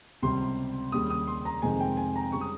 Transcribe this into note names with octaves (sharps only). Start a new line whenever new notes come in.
C#2 C3 G3 C6
D#2 C#3 G3 D#6
D#6
C6
A#5
F2 C3 D#3 G#3 G#5
G5
G#5
A#5
C#3 G3 C#6
D#6